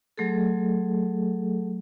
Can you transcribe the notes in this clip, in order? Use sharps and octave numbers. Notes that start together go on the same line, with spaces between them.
F#3 A3 G#4 A4